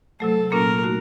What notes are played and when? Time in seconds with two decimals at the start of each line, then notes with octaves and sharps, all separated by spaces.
0.20 C3 F#3 A3 A4
0.52 A#2 F#3 A#3 C#4 F4 A#4
0.83 A3 D#4 F#4